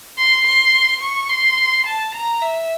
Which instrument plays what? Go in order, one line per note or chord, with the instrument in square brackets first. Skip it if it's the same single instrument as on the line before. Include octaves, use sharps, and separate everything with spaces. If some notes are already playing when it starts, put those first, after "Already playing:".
[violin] C6
C6
C#6
C6
A5
A#5
E5